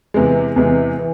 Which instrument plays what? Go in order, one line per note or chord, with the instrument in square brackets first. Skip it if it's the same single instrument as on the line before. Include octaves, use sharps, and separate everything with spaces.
[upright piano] E2 C3 E3 G#3
E2 C3 E3 G#3
E3